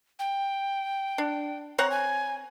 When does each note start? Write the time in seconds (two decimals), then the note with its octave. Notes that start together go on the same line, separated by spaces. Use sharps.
0.19 G5
1.18 D4
1.78 C4 C#5 F#5 A#5
1.91 G#5